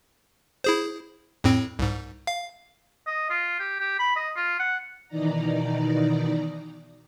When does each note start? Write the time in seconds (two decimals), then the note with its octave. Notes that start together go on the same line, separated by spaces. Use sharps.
0.64 E4 G#4 C5
1.44 F2 A2 C4
1.79 C2 G#2
2.27 F5
3.07 D#5
3.30 F4
3.60 G4
3.80 G4
3.99 B5
4.16 D#5
4.37 F4
4.59 F#5
5.08 B2 D#3 E3 D#4 D5 A#5